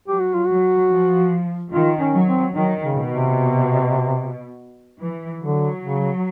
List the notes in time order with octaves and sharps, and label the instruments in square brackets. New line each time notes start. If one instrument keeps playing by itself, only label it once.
[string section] F#3 [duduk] G4
[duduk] F#4
F4
[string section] F#3 [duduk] F#4
[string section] F3
[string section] D#3 [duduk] F4
[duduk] C#4
[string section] F#3
[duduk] C4
[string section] D#3 [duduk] F#3
[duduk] C#3
[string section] B2
[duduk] C3
[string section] E3
[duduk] D3 [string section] F#3
[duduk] C#3